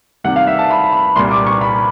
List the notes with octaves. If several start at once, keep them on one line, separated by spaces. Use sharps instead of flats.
C3 D#3 G3 F#5
F5
E5
A5
B5
B5
C2 A#2 G3 C6
D6
C#6
B5